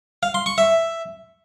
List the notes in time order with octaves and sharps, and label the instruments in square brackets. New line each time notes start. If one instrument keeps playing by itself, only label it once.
[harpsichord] F5
C6
C#6
E5